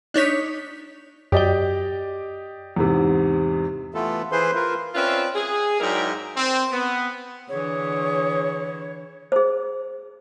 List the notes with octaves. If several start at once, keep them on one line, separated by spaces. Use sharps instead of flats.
D4 D#4 C#5 B6
F#2 G4 D5 D#5 G5
E2 G#2 C3
E3 A3 B3 F4 A4
E3 G#4 B4 C5 C6
F4 A#4 B4
C4 C#4 F4 B4 D5 E5
G#4
G#2 F#3 E4 A#4 D5 G5
C4
B3
D3 E3 G#4 C#5
G#4 C5